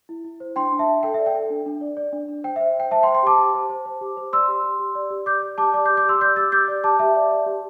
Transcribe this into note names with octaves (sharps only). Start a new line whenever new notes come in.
E4
E4
C5
D4 G5 C6
D4
E5 A5
D4
A4 G5
E5
D5
G5
A4
D4
D4
D5
D5
D4
D4
C5 G5
E5
C5
C5 G5
C5 E5 A5
G5 C6
C5
G5 C6
G4 A5 D6
G4
C5
C5
C5
G4
C5
D5 C6 E6
G4
G4
G4
D5
G4
D5 D6 G6
D5
G4 A5 D6
D5 A5 D6
D6 G6
G4
D6 G6
G4 C6 E6
D5 D6 G6
G4 E6 A6
G4 D6 G6
D5
G4 A5 D6
G4 E5 A5
D5
D5
G4